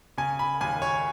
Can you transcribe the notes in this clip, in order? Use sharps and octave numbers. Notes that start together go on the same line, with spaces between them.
C#3 G#5
B5
D#2 G#5
C#5